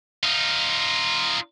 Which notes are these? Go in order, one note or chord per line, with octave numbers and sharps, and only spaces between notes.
D#4 F4